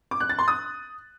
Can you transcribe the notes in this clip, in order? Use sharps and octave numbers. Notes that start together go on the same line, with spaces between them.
D6
F#6
A6
C6
D#6